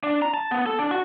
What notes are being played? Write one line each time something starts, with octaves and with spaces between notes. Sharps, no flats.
D4
A#5
A5
B3
A4
D4
F#4